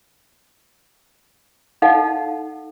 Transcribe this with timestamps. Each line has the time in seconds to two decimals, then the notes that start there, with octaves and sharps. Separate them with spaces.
1.82 D#4 A4 F5 F#5 A5